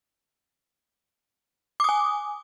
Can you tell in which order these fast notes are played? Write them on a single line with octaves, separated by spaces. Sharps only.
D6 D#6 G#5